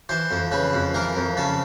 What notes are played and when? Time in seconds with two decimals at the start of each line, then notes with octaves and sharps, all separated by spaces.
0.09 E3 C5
0.31 F2
0.51 C#3 B4
0.73 F2
0.94 E3 A#4
1.16 F2
1.37 C#3 A4